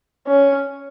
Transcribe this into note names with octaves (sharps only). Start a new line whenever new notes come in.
C#4